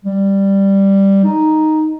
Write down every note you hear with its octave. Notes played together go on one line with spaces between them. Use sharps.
G3
D#4